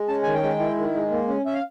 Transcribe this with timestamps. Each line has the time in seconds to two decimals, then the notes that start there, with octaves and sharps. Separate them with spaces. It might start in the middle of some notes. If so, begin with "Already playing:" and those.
Already playing: G#3
0.08 C#4 A5
0.23 D#3 G#5
0.34 G5
0.42 G#3
0.59 E4
0.77 D#3
0.94 G#3
1.11 A#3
1.28 C#4
1.45 C#4 E5
1.54 F5